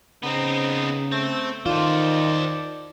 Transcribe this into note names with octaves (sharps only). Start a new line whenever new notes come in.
C#3 B3 C4 D#4
A3 C4
D#3 F4 A4 C5 D5